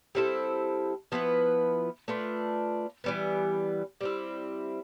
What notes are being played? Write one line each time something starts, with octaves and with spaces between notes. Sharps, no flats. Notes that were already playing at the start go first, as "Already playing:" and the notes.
G3 C4 E4 A4
F3 B3 E4 B4
A3 D4 F4 B4
E3 G3 B3
G3 C4 E4